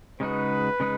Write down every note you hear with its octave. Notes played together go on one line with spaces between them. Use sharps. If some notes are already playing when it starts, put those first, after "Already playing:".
C#3 G#3 D#4 F#4 B4
C#3 G#3 D#4